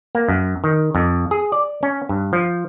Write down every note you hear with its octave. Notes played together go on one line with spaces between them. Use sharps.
A#3
F#2
D#3
F2
G#4
D5
C#4
G2
F3